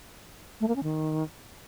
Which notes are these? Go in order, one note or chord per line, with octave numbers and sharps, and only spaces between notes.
A3
A#3
C#4
D#3